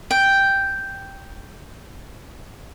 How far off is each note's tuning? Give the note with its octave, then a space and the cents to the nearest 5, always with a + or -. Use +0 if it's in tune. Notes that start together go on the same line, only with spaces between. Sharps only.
G5 +0